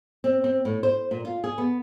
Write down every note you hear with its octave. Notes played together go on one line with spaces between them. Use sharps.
C4
C4
A2
C5
A#2
F4
G#4
B3